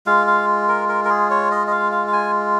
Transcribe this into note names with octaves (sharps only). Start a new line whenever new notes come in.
G#3 F4 F5
F5
A#4
A#4
A#4
G#4
C#5
D#5
D#5
F5
F5
F5
G#5